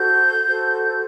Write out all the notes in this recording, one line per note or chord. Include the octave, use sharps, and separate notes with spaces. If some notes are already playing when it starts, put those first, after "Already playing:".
Already playing: F#4 A4 C5 G6
F#4 A4 C5